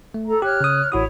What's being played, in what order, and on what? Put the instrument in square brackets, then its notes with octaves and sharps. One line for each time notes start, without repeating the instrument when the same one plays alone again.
[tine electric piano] A3
[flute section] A4 A#5
[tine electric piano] G4 [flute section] C#5 F6 F#6
[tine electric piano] C#3 D#6
[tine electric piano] A1 F#4 D#6 [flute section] E4 C#5